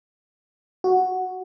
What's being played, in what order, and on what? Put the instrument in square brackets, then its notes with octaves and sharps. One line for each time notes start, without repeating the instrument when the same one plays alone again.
[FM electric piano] F#4